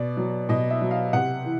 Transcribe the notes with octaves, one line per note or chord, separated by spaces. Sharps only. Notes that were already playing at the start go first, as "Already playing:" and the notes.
Already playing: B2 D5
F#3
B2 D#5
E5
F#3
F5
C3 F#5
E3